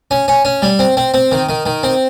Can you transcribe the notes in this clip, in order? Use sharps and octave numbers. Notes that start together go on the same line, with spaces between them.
C#4
C#4
C#4
G3
C4
C4
C4
D#3
D#3
D#3
C4